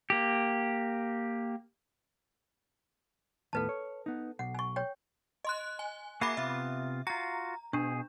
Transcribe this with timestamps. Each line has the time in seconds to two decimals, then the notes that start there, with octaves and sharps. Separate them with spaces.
0.10 A#3 G4
3.53 D#2 A2 B3 A4 B4 A5
3.69 C#5
4.06 B3 D#4
4.39 B1 F#5
4.55 G#5 C#6
4.76 C#5 G5
5.45 D#5 C6 F#6
5.79 G#5
6.21 A#3 F#4 G#4 E5 B5 D6
6.37 C3 B3 F4 E5
7.07 F4 F#4 A#5
7.73 B2 D4 G#4